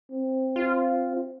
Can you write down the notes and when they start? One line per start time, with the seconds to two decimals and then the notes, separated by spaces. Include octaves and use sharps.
0.11 C4
0.56 F4